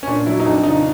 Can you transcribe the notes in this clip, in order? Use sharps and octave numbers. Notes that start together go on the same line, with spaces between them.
C#4
A#2 D4
F#3 E4
D#4
F2 D4
C#3 F3 D#4